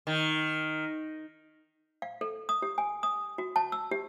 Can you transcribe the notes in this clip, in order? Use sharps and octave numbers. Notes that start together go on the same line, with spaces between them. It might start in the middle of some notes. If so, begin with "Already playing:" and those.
D#3
F5
A4
D#6
G4
G#5
D#6
F#4
A5
E6
G4